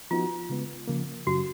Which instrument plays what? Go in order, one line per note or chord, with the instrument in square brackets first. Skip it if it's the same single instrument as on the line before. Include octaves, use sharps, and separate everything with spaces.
[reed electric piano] F3 B3 D#4 F#4 [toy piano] F4
[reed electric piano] C#3 G#3 B3
C#3 F3 A#3
[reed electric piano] F#2 C#3 F#3 [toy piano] F#4